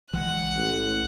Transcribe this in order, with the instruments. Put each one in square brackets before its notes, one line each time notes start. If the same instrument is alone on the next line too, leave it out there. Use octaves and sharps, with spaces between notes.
[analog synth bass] B1 [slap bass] E3 G#3 [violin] F#5 F#6
[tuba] A1